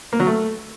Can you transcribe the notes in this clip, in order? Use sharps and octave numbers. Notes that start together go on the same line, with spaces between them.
A#3
F#3
A3